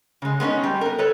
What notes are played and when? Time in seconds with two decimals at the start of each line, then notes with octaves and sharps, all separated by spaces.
0.22 C#3 G#3
0.40 G#3 B3 C#4 D#4
0.64 G3
0.81 B3 A#4
0.99 A4 B4 C#5